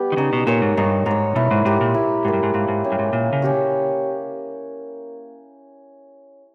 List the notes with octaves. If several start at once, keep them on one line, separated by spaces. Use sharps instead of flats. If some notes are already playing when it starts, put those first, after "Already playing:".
Already playing: G3 B3 G4
D#3
C#3 D#4
B2
A#2 A#4 C#5
G#2
G2 D#4
G#2 A#4 C#5
B2 E4
G#2
G#2 G4 A#4
A#2
E4
G#2 G4 A#4
G2
G#2
G#2 A#3
G#2
C#4 G4 C#5
G2
G#2
A#2 A#3
C#3
C#4 G4 C#5